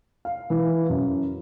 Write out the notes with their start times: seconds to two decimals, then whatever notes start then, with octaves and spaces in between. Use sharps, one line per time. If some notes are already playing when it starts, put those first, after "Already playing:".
0.25 F5
0.50 E3
0.89 F#2